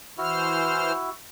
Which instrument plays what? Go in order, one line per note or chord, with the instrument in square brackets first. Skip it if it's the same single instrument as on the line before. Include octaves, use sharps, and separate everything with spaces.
[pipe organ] E3 C5 F6 [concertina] E4 F#4